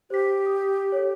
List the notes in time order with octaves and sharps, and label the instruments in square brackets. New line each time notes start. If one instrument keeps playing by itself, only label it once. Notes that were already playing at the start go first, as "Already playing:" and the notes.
[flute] G4 [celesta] C5 B6
[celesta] D#6
A4 C#5